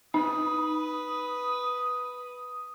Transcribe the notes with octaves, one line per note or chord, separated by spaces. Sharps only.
D#4 B4 D#6